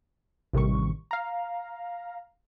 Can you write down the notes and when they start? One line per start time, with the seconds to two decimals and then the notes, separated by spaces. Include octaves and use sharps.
0.53 A1 C3 D#3 G3 C#6
1.11 F5 A#5